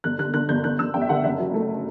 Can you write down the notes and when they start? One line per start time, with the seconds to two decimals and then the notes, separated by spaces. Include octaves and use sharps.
0.04 G1 F#6
0.19 D3 F#6
0.34 D3 F#6
0.49 G1 G6
0.64 D3 F#6
0.79 G1 E6
0.94 G1 G5
1.02 E5
1.09 D3 F#5
1.24 F#1 E5
1.40 F#3
1.54 A3